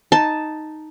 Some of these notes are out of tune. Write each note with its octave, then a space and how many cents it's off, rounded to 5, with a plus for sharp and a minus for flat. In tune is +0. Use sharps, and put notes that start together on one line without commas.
D#4 +0 A5 +0